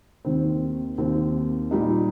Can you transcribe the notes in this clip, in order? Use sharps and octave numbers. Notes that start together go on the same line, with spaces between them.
D#2 D#3 C4
D#2 D#3 C4
A#2 G3 D#4